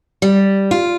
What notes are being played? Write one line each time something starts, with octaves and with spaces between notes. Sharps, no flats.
G3
F4